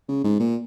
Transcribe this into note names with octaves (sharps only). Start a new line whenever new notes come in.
C#3
G#2
A#2